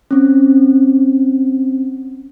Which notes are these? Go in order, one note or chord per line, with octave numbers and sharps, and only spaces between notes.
C4 C#4